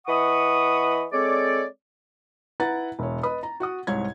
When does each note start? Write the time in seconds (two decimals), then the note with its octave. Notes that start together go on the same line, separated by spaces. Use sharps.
0.07 E3 D#5 F#5 B5 C#6 D#6
1.12 G#3 C4 A4 C#5 D5
2.60 E4 B4 F#5 A#5 A6
2.99 E1 C#5
3.23 B4 D#5 B5 D#6
3.43 A#5
3.60 F#4 F#5 D#6
3.87 C2 G#2 C#5 G#6